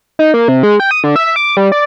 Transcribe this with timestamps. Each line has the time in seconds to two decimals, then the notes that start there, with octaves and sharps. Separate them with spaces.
0.19 D#4
0.34 A#3
0.48 C3
0.63 G#3
0.80 G5
0.91 D#6
1.04 D3
1.16 E5
1.36 D6
1.57 G3
1.72 D5